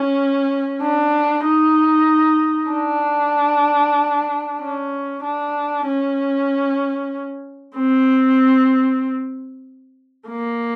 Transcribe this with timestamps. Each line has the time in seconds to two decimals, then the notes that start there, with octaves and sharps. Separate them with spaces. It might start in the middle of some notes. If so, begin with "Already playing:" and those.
Already playing: C#4
0.82 D4
1.45 D#4
2.71 D4
4.60 C#4
5.23 D4
5.86 C#4
7.76 C4
10.28 A#3